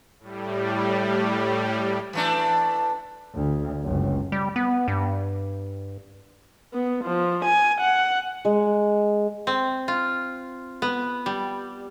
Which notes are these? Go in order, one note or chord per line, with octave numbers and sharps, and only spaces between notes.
A2 G3
E3 A3 D4
D2
F#1 C#2
G3
B3
G2
B3
F3
G#5
F#5
G#3
C4
F4
B3
G3